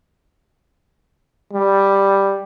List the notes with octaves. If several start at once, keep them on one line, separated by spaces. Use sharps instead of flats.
G3